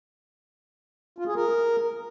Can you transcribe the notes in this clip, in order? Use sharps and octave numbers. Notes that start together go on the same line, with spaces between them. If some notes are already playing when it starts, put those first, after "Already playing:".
F4
G#4
A#4